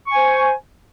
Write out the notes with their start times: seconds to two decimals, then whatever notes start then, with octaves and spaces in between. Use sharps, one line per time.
0.07 C#6
0.12 G#5
0.17 C5